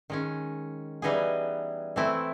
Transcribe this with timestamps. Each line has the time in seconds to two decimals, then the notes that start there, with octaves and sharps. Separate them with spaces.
0.10 D#3 G#3 C#4
1.02 E3 G3 B3 D#4 G#4
1.96 E3 A3 C4 E4